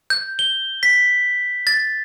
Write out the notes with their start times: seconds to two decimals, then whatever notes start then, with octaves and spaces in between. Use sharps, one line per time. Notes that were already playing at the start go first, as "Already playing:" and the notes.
0.10 G6
0.39 G7
0.83 B6
1.67 A6